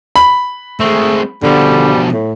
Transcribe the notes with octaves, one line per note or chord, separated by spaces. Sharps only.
B5
G#3 A3 C4
B2 D3 F3 G3
A2